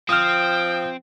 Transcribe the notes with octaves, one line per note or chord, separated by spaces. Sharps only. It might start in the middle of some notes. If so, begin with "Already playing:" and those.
F3 C4 G5 D#6 F6